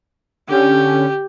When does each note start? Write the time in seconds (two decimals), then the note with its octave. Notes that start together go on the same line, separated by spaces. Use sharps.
0.48 D3 C#4 G4